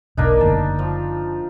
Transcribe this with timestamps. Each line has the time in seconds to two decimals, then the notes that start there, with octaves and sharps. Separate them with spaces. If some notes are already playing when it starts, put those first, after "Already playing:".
0.17 E1 B1 A#3 D4 D#4
0.41 F#1 D3 A3 A5
0.79 F3